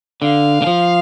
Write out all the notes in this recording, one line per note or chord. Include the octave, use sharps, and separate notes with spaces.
D3 F5
D3
F3